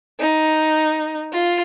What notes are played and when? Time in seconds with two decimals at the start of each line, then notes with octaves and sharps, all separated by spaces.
0.20 D#4
1.33 F4